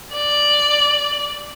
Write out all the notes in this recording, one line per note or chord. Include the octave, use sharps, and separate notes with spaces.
D5